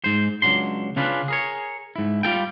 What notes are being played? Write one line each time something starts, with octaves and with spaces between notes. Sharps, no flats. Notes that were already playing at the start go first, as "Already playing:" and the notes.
G#2 C5
C#2 F#3 D4 C6
C#3 C#4 D4 F4 B4
G#4 A#4 C#5
G#2 E4
G3 F4 A4 G5